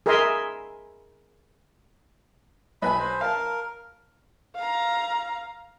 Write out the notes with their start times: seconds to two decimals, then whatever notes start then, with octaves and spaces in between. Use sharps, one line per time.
0.06 G#4 A#4 D#5 E5 G#5 C6
2.82 B1 B4 G#5 B5
2.99 C5
3.21 A#4 F5 A5
4.56 F5 A#5